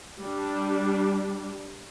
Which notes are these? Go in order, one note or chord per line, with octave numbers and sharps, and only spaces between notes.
G3 D4